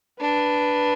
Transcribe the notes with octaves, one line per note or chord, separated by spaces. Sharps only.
D4 B4